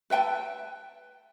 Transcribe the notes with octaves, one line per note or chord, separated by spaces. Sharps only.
B4 E5 G5 A5